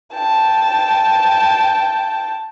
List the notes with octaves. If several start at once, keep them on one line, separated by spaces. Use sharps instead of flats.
G5 A5